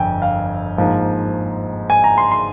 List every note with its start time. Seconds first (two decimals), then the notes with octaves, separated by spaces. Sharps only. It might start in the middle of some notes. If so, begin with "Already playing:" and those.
Already playing: G1 F2 G5 G#5
0.22 F5
0.78 G#2 F3 A#3
1.90 G#5
2.04 A#5
2.18 C6
2.31 C6